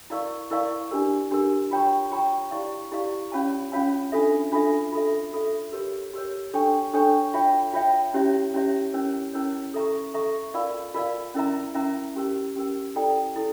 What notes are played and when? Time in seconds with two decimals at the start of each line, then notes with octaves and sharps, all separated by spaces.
0.10 E4 A#4 D5 F5 C#6
0.51 E4 A#4 D5 F5 C#6
0.91 D4 G4 A#4
1.31 D4 G4 A#4
1.71 F4 C#5 G5 A#5 C#6
2.12 F4 C#5 G5 A#5 C#6
2.51 E4 G4 D5 F5 C#6
2.92 E4 G4 D5 F5 C#6
3.32 C#4 F4 C#5 F5 A5
3.72 C#4 F4 C#5 F5 A5
4.12 D4 F4 A4 E5
4.52 D4 F4 A4 E5
4.92 F4 A4 E5
5.33 F4 A4 E5
5.72 G4 A#4 C#5
6.13 G4 A#4 C#5
6.53 D4 A4 C#5 G5 C#6
6.93 D4 A4 C#5 G5 C#6
7.34 F4 C#5 E5 G5
7.73 F4 C#5 E5 G5
8.14 C#4 E4 G4 C#5 E5
8.54 C#4 E4 G4 C#5 E5
8.94 C#4 E4 A#4 C#5
9.34 C#4 E4 A#4 C#5
9.74 A4 E5 A#5 C#6
10.14 A4 E5 A#5 C#6
10.54 F4 A#4 D5 F5
10.94 F4 A#4 D5 F5
11.34 C#4 E4 A#4 E5 A#5
11.75 C#4 E4 A#4 E5 A#5
12.15 C#4 G4 A#4
12.56 C#4 G4 A#4
12.95 E4 A4 D5 G5 A#5
13.36 E4 A4